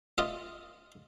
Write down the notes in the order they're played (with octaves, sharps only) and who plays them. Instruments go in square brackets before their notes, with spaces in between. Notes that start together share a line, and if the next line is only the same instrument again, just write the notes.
[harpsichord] F4 D#5 E5